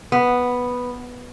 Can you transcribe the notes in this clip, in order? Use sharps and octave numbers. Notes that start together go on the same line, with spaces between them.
B3